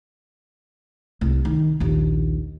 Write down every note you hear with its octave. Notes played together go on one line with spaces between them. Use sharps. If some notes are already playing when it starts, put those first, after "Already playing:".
C2
D#3
A#1 D#2